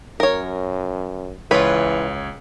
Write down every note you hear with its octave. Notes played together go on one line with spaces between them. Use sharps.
F#2 A#4 C#5
C#2 E3 F4 B4 C#5